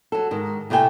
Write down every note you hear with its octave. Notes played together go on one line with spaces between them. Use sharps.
F#3 A4
G#2 D#3
A2 C3 A3 D5 G5 G#5